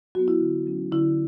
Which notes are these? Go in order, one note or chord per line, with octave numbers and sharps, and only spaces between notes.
F#3 B3 F#4
E4
D3
F#3 C#4
D3 E4